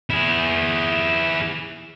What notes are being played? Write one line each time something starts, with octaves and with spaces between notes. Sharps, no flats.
E4 G#4